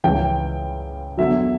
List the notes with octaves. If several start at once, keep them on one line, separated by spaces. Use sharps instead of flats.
C#2 C#3 E3 G5
E2 D3 F#3 E5